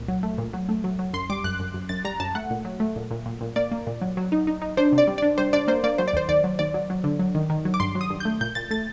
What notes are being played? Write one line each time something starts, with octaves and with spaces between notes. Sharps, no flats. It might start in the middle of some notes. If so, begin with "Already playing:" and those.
Already playing: C2 A#2
F#3
A3
A#2
F#3
A3
F#3
F#3
F#2 C6
G3 D6
F#2 F#6
F#2
F#2
F#2 A6
G3 A#5
F#2 A5
A3 F#5
A#2
F#3
A3
A#2
A#2
A#2
A#2
A#3 D5
A#3
A#2
F#3
F#3
D#4
D#4
D#4
D4 C5
C3
D5
G3
D4 D5
G3 C5
D4 D5
A#3 C5
A#3 D5
F#3 C5
D5
D#2 C5
D#2 D5
F#3
D#2 D5
F#3
F#3
D3
F#3
D#3
D#3
F#3
D6
G2 C6
F#3
D#6
G2
A3 G6
A#2 G6
A#2 A6
A3 A6